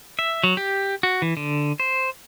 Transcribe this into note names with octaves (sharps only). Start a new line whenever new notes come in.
E5
F#3
G4
F#4
E3
D3
C5